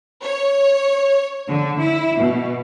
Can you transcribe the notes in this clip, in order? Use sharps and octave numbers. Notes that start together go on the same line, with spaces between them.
C#5
D3
E4
B2